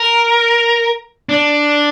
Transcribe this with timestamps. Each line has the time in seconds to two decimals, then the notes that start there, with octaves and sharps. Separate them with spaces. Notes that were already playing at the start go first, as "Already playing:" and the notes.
Already playing: A#4
1.29 D4